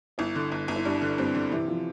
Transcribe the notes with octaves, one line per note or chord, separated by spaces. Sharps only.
G1 E4
D3
G1
G1
E4
G2 D4
D3
G2 C4
D3
C3 E3
F3